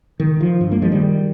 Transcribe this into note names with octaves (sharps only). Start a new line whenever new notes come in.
D#3
F3
G2
G3 A#3
F3 G#3
D#3 G3